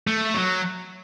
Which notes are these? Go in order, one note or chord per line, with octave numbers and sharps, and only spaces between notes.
A3
F#3